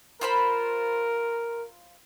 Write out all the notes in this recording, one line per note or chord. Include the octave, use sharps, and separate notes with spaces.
F4 A#4 C5 B5